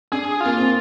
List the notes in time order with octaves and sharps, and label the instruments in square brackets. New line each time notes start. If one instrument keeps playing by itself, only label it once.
[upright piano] D4 [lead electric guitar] G#4
[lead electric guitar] F4
[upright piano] A#3
C4